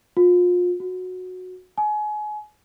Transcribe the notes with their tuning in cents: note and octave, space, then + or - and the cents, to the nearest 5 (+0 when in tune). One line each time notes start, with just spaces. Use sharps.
F4 +35
F#4 -10
G#5 +30